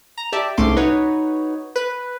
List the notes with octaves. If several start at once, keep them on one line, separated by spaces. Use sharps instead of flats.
A#5
G4 D5 E5 A5
C2 G#2 A3 C#4 C6 D6
D#4 F#4 B4 C#5
B4